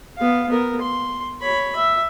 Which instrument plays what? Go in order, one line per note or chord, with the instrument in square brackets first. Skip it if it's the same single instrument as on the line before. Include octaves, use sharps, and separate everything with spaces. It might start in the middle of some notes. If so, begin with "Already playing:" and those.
[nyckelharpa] B3 F5
B3 A#4
C6
C#5 B5
E5